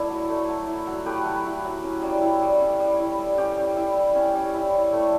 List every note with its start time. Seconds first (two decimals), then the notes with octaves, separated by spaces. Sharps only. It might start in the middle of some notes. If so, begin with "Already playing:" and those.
Already playing: A3 E4 D5
0.10 F#3
0.29 A3
0.49 F#3
0.67 E4
0.87 F#3
1.06 A3 G4 B4
1.26 F#3
1.45 E4
1.65 F#3
1.83 C#4
2.02 G3
2.21 E4
2.42 G3
2.61 C#4
2.80 G3
3.00 E4
3.19 G3
3.38 C#4 G4
3.57 G3
3.76 E4
3.96 G3
4.15 C#4
4.35 G3
4.54 E4
4.73 G3
4.92 A3